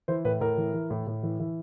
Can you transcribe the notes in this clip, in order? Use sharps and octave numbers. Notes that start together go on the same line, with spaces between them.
E3 C5
A2 B4
A2 A#4
E3
E3
A2
A2
E3
E3